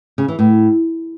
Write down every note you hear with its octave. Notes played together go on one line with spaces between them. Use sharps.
C#3
E3
A2